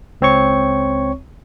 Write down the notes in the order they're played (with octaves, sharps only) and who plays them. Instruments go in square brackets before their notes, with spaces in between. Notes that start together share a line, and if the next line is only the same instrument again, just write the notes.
[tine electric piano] C#2 C4 C#5 C#6